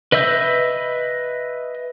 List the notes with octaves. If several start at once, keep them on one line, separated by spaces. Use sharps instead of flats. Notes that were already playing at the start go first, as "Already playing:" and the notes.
B4 D#5 E5 E6 G6